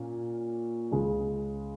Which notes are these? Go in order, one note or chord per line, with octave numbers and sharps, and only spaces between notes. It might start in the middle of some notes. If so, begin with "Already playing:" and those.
Already playing: A#2 A#3 C#4
C#2 C#3 G#3